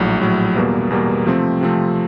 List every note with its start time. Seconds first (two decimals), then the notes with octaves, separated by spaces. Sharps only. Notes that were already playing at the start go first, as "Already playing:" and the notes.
Already playing: A#1 A2 F#3
0.19 A#1 A2 F#3
0.56 E2 B2 G3 A#3
0.90 E2 B2 G3 A#3
1.26 C3 F3 A3 C4
1.61 C3 F3 A3 C4